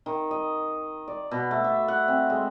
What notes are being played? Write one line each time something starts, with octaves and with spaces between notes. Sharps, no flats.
D#3
D#5
D5
B2
A3
E5
F#5
C4
G#3